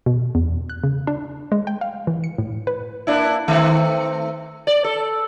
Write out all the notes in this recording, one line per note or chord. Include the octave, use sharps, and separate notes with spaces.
B2
E2
F#6
C#3
D4
G#3
G5
F5
E3
C#7
A2
B4
A#3 D4 E4
D#3 A3 C4
D5
A4